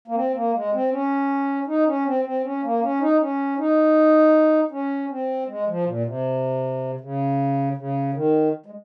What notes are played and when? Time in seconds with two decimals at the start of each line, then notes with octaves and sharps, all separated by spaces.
0.08 A#3
0.15 C4
0.34 A#3
0.53 G#3
0.73 C4
0.91 C#4
1.67 D#4
1.87 C#4
2.05 C4
2.25 C4
2.44 C#4
2.63 A#3
2.82 C#4
3.00 D#4
3.20 C#4
3.58 D#4
4.71 C#4
5.10 C4
5.47 G#3
5.68 F3
5.86 A#2
6.06 C3
7.01 C#3
7.77 C#3
8.14 D#3
8.66 G#3